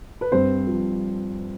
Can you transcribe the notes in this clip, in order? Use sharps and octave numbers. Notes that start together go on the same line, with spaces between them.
B4
G2 C4 C5
F3